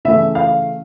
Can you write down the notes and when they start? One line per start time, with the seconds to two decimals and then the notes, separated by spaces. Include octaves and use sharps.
0.05 C#3 E3 A3 C#4 E5
0.35 F5